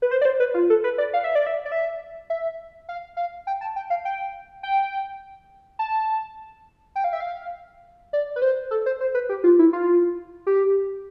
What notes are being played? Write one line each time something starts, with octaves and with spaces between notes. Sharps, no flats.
B4
C5
D5
C5
B4
F4
A4
B4
D5
F5
E5
D5
E5
D5
E5
E5
F5
F5
G5
A5
G5
F5
G5
G5
A5
G5
F5
E5
F5
D5
B4
C5
A4
C5
C5
B4
G4
F4
E4
F4
G4